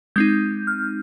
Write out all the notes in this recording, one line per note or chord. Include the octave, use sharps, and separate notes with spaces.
G#3 C4 D#4 G6
F6